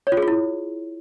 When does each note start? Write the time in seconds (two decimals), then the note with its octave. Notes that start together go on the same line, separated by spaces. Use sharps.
0.07 C#5
0.12 F4
0.17 G#4
0.22 F4
0.28 E4